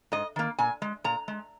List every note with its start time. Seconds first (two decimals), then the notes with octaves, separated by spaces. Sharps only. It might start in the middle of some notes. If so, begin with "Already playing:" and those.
0.12 G#2 D#5
0.36 D#3 A#3
0.59 A#2 G#5
0.82 G#3
1.04 A#2 A#5
1.28 G#3